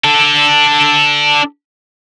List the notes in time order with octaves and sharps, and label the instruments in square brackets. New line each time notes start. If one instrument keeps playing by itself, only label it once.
[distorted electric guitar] D4 A4